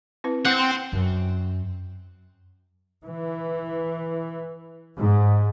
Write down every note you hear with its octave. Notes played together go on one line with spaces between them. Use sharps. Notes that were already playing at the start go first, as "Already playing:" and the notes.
C4 E4 B4
C4 C5 F#5 G5 D6
F#2
E3
G#2